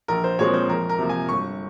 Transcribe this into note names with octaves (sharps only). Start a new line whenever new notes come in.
A#1 A#4
C5
A#2 F3 G#3 C4 C#5
C5
F2 A#4
A#4
C3 F3 A#3
G#5
G1 C#6